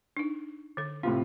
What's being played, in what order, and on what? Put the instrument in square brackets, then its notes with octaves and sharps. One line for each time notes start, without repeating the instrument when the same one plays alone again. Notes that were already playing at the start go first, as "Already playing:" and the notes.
[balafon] D4 D#4
D3 A4
[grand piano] A2 C3 F4 [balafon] C4